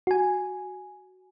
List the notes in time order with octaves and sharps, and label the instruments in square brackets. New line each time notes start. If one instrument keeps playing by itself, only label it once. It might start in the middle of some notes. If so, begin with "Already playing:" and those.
[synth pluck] F#4 G#5